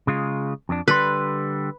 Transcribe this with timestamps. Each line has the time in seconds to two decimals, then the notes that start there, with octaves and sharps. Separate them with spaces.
0.07 C#3 G#3 F4
0.69 F2 D4
0.88 D3 G3 B4 C6